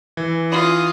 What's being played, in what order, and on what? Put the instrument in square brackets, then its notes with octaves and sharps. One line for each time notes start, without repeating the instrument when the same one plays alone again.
[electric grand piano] E3
[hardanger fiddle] F4 D#6